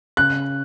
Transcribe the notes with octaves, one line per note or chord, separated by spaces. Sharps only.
C#3 F#6